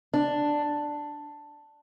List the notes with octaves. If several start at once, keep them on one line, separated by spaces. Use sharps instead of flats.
D4